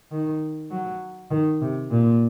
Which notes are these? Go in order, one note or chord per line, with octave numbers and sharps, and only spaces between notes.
D#3
F#3
D#3
C3
A#2